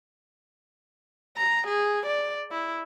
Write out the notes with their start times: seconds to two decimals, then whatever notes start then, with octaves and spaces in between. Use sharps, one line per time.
1.37 A#5
1.67 G#4
2.07 D5
2.52 E4